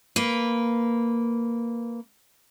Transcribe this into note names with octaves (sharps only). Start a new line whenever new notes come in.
A#3 B4